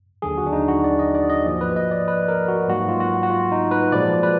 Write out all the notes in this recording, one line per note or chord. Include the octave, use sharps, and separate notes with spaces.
D#2 D3 F#3 G#4
F#4
D4
D#4
F#4
D5
D#5
D5
D#5
G#2 F3 A#3
B4
D#5
D5
B4
A#4
F#4
G#2 F#3 A#3 F#4
F4
F#4
F#4
F4
D#4
B4
A#2 F3 G#3 D5
B4